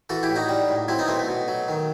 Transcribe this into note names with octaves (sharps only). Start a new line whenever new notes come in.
E3 F#4 A4
E4 G4
A2
D#4 F#4
G3
A2
F#3 C4 E4
B3 D#4
B2 A3 C4
A3
B2
F#3
D#3